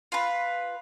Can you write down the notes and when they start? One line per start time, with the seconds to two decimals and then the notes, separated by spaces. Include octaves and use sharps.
0.12 F4 B4